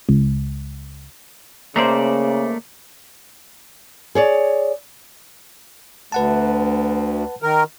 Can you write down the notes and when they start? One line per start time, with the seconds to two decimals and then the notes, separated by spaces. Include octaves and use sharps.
0.09 C#2
1.76 C#3 A3 A#3 C5 D5 E5 A#5
4.15 G#4 C#5 D5
6.12 D2 B4 F#5 A5
7.42 D#3 A#4